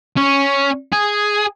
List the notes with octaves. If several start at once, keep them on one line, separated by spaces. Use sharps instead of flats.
C#4
G#4